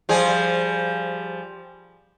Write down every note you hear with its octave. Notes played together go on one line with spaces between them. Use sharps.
F3 G3 G#4